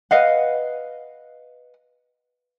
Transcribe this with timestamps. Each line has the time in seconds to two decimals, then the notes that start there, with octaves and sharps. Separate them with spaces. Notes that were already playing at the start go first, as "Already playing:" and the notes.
0.11 B4 D#5 F5 F#5